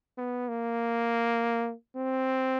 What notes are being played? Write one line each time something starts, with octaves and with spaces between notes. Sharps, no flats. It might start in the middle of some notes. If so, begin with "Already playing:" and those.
B3
A#3
C4